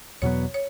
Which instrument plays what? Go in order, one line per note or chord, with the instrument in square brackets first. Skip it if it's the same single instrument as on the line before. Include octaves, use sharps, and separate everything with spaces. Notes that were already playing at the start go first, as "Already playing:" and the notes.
[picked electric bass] E2 B2 F#3 B3 [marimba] C#5
[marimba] C#5